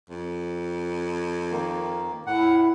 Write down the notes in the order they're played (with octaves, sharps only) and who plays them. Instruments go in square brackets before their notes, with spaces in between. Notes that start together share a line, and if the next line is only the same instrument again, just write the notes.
[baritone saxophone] F2
[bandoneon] D#3 A#3
[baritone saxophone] A2 [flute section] E4 B5 [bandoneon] F#5